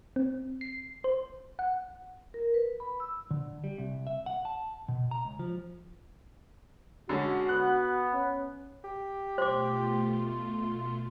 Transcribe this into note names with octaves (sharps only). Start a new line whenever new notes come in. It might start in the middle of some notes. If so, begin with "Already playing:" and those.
C4
C7
C5
F#5
A#4
B4
B5
E6
D3
G3
C2
E5
F#5
A5
B2
A#5
C#2
F3
D3 G#3 C#4 F#4
B3 F#6
C#4
G4
B2 A3 F4 C5 C6 D6